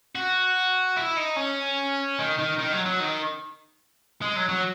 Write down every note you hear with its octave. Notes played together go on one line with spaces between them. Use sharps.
F#4
E4
D#4
C#4
D#3
D#3
D#3
F#3
F#3
D#3
G#3
F#3
F#3